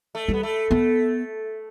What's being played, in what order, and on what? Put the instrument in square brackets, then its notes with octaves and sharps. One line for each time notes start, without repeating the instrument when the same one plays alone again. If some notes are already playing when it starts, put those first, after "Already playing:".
[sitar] A3
[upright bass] G3
[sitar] B3
A3
[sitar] A3 [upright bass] B3